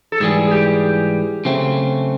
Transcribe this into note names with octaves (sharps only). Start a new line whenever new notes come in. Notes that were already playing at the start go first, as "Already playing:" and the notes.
A4
G#2 E3 G3 G#4
G4
C#3 F#3 A3 C4